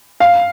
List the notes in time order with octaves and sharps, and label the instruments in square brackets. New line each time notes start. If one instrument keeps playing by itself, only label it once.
[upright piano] F5